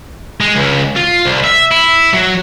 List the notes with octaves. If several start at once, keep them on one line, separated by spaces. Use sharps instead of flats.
G#3
C#2
F4
C2
E5
E4
F#3